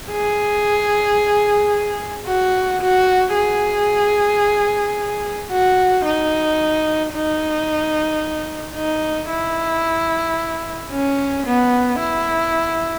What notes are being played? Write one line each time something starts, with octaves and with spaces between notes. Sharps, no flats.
G#4
F#4
F#4
G#4
F#4
D#4
D#4
D#4
E4
C#4
B3
E4